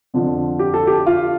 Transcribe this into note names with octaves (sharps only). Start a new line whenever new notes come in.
F2 D3 F3
G4
A4
G4
F4